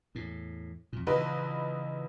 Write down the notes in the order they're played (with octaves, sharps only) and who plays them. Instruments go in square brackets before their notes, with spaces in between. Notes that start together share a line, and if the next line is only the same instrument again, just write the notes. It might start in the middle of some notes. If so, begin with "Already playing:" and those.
[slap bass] E2 A2
F2 A#2
[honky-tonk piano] A#1 D#4 B4 [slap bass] C#3 E3